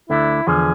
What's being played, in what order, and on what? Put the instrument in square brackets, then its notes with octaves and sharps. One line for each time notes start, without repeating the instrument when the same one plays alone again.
[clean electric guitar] D2 D3 A3 [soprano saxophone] E4
[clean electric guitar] E2 D3 F3 [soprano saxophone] G#4